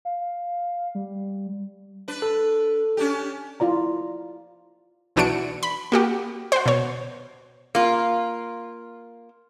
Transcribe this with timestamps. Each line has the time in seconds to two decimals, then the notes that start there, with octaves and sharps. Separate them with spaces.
0.05 F5
0.95 G3
2.08 D4 B4
2.22 A4
2.97 C#4 D4 G4
3.60 E4 F4 D5 A#5
5.16 B1 E3 D4 F#4 C#7 D7
5.63 B5
5.92 A#3 F#4 G4
6.52 F#4 C5
6.66 B2 C#5
7.75 A#3 F4